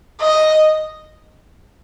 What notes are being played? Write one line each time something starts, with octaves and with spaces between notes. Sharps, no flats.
D#5